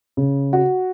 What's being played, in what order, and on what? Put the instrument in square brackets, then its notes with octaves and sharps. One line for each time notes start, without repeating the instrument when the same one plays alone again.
[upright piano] C#3
F#4